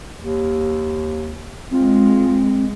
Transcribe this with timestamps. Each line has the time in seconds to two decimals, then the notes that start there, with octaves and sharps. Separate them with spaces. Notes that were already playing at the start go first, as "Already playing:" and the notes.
0.18 D#2
1.71 G#3 C4 F4